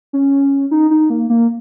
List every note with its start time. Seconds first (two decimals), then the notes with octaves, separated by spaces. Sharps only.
0.13 C#4
0.71 D#4
0.91 D#4
1.10 A#3
1.30 A#3